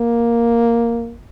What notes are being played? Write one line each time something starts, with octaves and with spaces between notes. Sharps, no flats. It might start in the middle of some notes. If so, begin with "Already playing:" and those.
Already playing: A#3